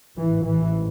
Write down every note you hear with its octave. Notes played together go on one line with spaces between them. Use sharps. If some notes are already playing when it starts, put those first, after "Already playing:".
A1 G#2 E3
E3